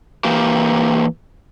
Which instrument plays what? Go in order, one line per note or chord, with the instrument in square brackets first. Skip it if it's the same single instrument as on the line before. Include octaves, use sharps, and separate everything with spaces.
[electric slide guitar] E3 A#3 G4